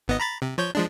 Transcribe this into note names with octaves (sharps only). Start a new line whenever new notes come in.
G#1 B3 D#5
A#5 B5 A6
C3
F3 C#5 G6
F3 G#3 D4